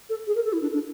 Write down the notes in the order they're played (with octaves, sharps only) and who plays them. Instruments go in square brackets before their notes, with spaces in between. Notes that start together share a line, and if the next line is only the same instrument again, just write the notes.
[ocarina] A4
G#4
A#4
A4
E4
D4
D4